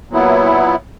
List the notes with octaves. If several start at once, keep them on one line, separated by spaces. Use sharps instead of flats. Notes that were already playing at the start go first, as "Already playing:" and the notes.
A#2 F#3 B3 E4